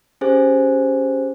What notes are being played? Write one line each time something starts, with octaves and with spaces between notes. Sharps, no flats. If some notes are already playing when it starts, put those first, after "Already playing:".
C#4 G4 G#4 C5 G#5